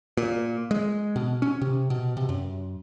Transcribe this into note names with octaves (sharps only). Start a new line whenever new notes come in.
A#2
G#3
B2
C#4
C3
B2
C3
F#2